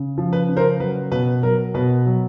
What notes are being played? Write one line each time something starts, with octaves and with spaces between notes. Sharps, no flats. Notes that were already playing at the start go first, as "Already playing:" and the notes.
Already playing: C#3
F3
B4
C#3
A#4 C5
F#3 B4
B2 B4
F#3 A#4
B2 B4
F#3